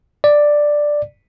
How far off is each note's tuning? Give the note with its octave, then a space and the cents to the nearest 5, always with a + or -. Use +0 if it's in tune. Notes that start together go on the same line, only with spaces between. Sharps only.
D5 +5